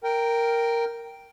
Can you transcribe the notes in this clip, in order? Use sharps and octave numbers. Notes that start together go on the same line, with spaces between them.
A#4 G5